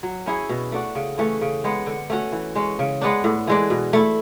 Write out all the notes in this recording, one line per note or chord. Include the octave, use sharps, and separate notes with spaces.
F#3
C#4 E4 G#4
B2
A3 D4 F#4
C#3
E3 A3 C#4
C#3
G#3 B3
D3
A3 C#4 F#4
E3
G#3 C#4
C#3
G#3 B3 D4
A2
E3 G#3 D4
B2
A3 E4